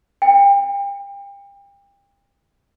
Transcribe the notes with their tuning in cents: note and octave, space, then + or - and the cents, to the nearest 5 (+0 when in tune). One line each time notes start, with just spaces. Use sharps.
G5 +35